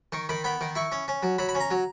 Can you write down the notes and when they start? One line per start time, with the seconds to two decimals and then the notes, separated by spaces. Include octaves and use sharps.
0.12 D#3 C#6
0.29 D#3 B5
0.44 B3 B5
0.61 D#3
0.75 E4 C#6
0.92 C#4
1.08 C#4
1.23 F#3
1.38 F#3 B5
1.49 B5
1.55 C#4
1.60 A#5
1.71 F#3